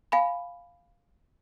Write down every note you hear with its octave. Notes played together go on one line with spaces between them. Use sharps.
F5 G#5 B5